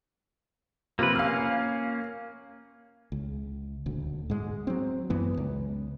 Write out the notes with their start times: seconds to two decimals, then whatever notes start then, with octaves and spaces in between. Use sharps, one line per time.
0.99 C3 F3 A#3 F4 B4
1.15 A#3 C#4 F5 F6
3.12 C#2
3.86 D#1 D2
4.30 G#2 G#3
4.67 F#3 C4
5.10 F#2 E3 B3
5.37 C#2